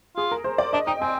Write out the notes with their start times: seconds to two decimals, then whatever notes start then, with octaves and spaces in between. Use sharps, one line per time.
0.16 F4 G#4
0.32 A#4
0.44 C5
0.58 D5
0.73 D4 D#5
0.87 D#4 G5
1.01 C4 G#5